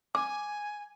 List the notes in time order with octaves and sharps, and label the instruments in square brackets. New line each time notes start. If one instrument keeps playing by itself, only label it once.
[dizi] G#5 [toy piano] D6